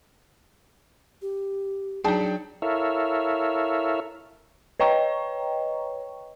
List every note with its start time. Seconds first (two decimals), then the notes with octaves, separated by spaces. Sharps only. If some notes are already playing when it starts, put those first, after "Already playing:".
1.22 G4
2.04 F#3 D4 D#4 G#4 G5 A5
2.62 E4 A4 A#4 C#5 E5 F5
4.80 B4 C#5 D#5 G5 A#5 C#6